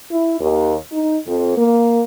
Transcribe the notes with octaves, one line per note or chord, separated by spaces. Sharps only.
E4
D#2
D#4
F2
A#3